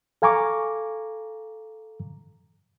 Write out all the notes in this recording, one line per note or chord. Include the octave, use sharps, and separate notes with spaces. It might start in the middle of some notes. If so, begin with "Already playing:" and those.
A4 F5 G#5 A#5 C#6 D6